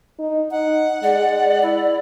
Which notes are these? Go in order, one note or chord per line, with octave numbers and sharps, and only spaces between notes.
D#4
D#4 F#5
G#3 D5
E4